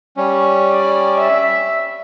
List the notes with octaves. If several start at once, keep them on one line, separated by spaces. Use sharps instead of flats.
G3 C#4
D5
E5